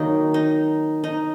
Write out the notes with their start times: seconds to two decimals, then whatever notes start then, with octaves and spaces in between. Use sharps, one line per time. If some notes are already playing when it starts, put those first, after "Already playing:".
Already playing: D#3 F#3 A#3 D#4
0.34 D#4
1.04 D#4